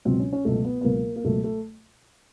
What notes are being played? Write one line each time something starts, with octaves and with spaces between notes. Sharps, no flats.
C#2 B2 F#3 C4
C#4
C#4
C#2 B2 F#3 A3
B3
B3
C#2 B2 F#3 A#3
A#3
C#2 B2 F#3 A3
A3